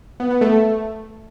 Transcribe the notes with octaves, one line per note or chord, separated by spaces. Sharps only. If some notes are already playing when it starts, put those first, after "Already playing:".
B3
B3
A3